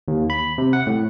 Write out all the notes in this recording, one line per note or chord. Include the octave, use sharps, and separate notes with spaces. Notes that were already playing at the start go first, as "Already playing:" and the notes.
D#2
B5
C3
F#5
A2